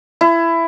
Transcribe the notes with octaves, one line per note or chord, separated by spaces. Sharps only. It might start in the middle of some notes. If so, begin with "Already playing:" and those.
E4